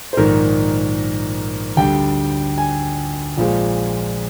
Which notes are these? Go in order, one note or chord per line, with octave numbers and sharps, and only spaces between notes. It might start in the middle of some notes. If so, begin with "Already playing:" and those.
C5
A#1 G#2 D#3 A#4
D2 D3 G3 G5
G#5
A#1 A#2 F3 G#3